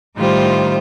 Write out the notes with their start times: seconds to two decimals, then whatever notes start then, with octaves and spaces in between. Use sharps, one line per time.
0.16 A2 D#3 G3 F4 C5